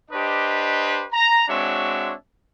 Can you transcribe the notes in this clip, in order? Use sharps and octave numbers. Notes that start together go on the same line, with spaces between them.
D4 G4 B4 C5 D#5
A#5
G#3 C4 D4 F#4 C#5 E5